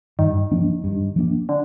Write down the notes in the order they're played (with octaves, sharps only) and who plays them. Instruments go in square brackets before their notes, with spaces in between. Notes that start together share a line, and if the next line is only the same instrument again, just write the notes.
[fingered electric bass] G2 [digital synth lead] D#3
[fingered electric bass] F3 A#3 D4
G2
F3 A#3 D4
[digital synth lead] D3